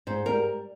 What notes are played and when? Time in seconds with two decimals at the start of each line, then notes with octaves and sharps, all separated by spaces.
0.07 G#2 C5
0.25 G3 A#4